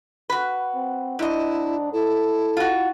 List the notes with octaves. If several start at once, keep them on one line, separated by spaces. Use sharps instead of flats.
F#4 B4
C4
G#2 D4 E4 D#5
E4 A4
F4 F#4